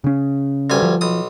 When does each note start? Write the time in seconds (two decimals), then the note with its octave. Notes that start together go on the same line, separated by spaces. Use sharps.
0.04 C#3 C#4
0.70 D2 G2 G#5
0.83 F3
1.01 B1 D#6